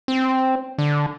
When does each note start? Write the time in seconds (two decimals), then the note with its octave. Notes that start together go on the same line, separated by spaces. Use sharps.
0.08 C4
0.78 D3